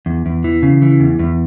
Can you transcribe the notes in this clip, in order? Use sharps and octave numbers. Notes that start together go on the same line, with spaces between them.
E2
E2
E3
C#3
E3
E2
E2